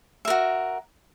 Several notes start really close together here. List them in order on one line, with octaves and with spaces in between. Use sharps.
E5 A#4 F#4